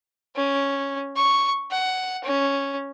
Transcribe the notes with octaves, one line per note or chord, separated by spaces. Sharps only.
C#4
C#6
F#5
C#4